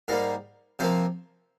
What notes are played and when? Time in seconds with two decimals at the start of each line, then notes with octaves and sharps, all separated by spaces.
0.08 G#2 G3 A#3 A#4
0.79 C3 F3 A#3 C5